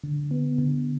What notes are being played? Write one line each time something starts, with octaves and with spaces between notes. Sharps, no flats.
D3
B3
D3